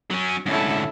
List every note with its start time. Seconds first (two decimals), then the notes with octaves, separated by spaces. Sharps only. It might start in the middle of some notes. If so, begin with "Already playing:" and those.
0.10 F#3 C#4
0.46 D2 G#2 C#4 E4 A4